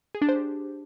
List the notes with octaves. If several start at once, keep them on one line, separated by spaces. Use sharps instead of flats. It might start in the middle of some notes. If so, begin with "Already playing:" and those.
G#4
D4
C5
G4